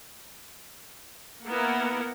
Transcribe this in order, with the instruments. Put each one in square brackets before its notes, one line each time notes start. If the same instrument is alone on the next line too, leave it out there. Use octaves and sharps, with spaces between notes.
[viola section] A#3 B3 E4 A#4 F#5